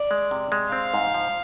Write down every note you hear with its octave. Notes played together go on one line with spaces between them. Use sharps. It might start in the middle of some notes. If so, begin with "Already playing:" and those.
Already playing: D5
G#3
C3
G#3
C4 F5
G#2
F3